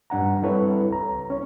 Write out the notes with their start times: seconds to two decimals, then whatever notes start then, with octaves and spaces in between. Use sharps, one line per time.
0.10 G2 D4 F#5 A#5
0.42 G3 C4 E4 A4 B4 C#5
0.90 C#2 A#5
1.30 C#4 C#5